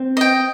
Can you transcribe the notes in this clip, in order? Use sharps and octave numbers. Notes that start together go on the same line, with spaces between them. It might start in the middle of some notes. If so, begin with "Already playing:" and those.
Already playing: C4
D#5 G5